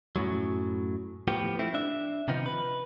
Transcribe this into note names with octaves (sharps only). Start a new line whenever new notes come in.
F#2 A2 F#3
A2 F3 B3 G4
A3 C4 E4
D4 E5
C3 D#3 F3 B3 D#4
B4